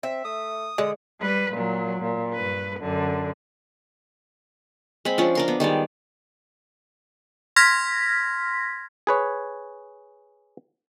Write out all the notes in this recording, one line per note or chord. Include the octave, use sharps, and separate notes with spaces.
C4 E5
A3 D#6
D3 G#3
G3 B4
A#2 F#3
A#2
G2 B4
F#2 D3
G#3 C4 B5
F3 C#4 D4
D4 A#4 C6
B3
D#3 G3 G#3 D5
C6 F6 G#6 A#6 B6
G#4 B4 C#5